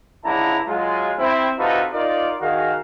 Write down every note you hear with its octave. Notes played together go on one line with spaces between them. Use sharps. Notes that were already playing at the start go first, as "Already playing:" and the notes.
C#2 D3 E4 A5 A#5
F#3 G#3 F4
C4 E4
C3 D#4 F4 F#4 A4 B4
D#4 F4 A#4 D5
D#3 F#4 G#4 A#4 F5